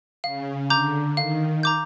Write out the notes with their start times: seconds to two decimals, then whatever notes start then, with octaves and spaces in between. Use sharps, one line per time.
0.24 C#3 F5
0.70 D3 A#5 D6 G6
1.17 D#3 F5
1.63 A#5 D6 G6